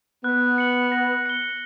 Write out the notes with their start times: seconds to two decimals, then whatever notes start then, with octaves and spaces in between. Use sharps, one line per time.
0.24 B3 F#6
0.58 C#7 F#7
0.92 A#6
1.26 C#7 G7